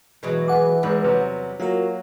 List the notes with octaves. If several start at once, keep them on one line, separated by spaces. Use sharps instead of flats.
B2 E3 F#3 G#3
G#4 B4 F#5 D6
G#1 E2 G#3 B4
C3 F#3 G3
F#3 A#3 F4 F#4 A#4